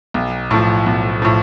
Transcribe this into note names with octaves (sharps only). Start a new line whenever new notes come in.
B1
A2 F3
B1
A2 F3